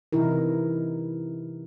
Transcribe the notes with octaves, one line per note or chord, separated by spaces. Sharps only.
C3 E3 D#4 E4 A#4